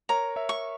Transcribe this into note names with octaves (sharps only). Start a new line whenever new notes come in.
A#4 C#5 A#5
C#5 E5
C#6